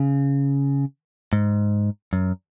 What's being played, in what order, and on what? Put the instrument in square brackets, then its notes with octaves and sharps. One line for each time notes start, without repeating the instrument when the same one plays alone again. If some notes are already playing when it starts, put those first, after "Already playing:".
Already playing: [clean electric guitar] C#3
G#2
F#2